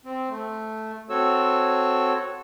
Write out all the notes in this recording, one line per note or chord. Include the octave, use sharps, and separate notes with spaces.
C4
A3
C4 F#4 A4 C#5 E6